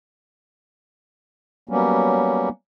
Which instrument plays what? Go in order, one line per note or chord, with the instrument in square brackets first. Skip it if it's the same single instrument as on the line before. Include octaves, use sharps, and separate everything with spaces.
[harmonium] F#3 G3 A#3 B3 C#4